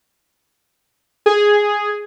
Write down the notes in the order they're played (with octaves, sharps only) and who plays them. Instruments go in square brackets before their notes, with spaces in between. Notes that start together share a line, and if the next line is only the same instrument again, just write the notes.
[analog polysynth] G#4